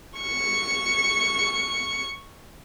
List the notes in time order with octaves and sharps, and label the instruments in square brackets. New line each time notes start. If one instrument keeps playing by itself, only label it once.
[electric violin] C#6 C#7